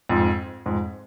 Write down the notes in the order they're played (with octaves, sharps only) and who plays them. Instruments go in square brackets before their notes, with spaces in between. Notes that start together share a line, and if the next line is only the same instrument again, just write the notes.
[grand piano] F2 G#2
F2 G#2